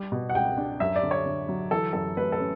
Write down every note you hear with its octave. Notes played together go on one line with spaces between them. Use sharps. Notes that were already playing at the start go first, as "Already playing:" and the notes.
Already playing: G3
B2
F#5
C#2 G5
D4
F#2 E5
D5
D3
C#5
D3
F#3
E3 A4
F#2 A4
A3 B4
A4
C#4